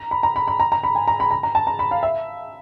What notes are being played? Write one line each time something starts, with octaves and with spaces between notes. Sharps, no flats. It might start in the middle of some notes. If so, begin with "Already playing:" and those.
Already playing: A#5
B5
A#5
B5
B5
A#5
A#5
B5
G#5
A#5
B5
A#5
A#5
A5
A#5
B5
F5
E5